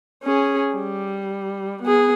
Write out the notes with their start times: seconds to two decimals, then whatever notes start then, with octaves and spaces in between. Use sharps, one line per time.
0.23 C#4 G#4
0.75 G3
1.83 B3 G#4